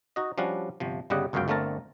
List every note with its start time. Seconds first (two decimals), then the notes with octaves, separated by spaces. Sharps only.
0.16 D#4 F#4 D#5
0.38 F3 G3 C#4 D4 F#4
0.80 G1 C3 F3
1.10 G1 C#3 G3 G4 D#5 F#5
1.33 G1 C#2 F#2 F#4 F5 G5
1.48 G1 D3 A3 C4 A#4 A5